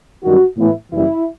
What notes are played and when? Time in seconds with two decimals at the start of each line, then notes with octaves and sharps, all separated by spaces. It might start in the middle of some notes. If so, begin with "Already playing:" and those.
0.24 G1 F#2 D#3 G3 F#4
0.58 A2 E3 B3 E4
0.92 F#1 F#2 E3 G3 E4